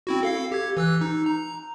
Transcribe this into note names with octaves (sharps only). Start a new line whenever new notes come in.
C4 E4 F#4
A4 F5 C7
G4 G#6
E3 E6 F#6
D#4
A#5